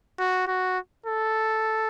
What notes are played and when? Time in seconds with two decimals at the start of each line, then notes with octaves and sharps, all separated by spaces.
0.19 F#4
0.48 F#4
1.06 A4